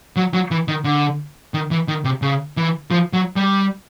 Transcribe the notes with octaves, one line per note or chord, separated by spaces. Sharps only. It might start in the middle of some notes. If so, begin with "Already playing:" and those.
F#3
F#3
E3
D#3
D3
D#3
E3
D#3
C3
C#3
E3
F3
F#3
G3